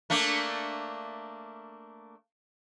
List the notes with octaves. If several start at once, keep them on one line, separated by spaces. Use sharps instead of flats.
A3 A#3 D4